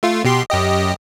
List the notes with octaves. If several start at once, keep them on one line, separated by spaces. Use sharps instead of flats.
A3 F4
B2 G4 C6
F#2 G4 D#5